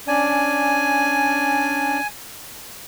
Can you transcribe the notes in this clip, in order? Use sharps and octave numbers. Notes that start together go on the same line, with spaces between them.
C#4 D4 D5 G#5